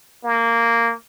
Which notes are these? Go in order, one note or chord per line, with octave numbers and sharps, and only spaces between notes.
A#3